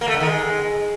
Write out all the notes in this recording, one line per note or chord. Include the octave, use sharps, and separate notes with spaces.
A#3
A3
D3
D#3
G#3